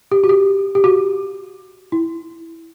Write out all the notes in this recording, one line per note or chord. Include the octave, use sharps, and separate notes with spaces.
G4
F#4
G4
G4
F#4
E4